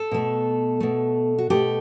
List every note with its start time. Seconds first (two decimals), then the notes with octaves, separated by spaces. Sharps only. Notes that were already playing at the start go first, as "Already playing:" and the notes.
Already playing: A4
0.11 B2 A3
0.80 B2 A3
1.38 F#4
1.50 B2 A3 G4